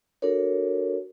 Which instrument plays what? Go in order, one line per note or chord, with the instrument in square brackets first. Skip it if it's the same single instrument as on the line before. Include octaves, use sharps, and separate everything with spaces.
[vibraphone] D4 F#4 A4 A#4 C#5